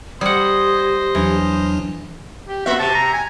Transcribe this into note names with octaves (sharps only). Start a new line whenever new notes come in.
G3 G4 C5 D#5 F#5 D#6 G#6
E2 E3 F#3 D4
G4
A#3 F#4 E5
C3 A5
A#5
G#5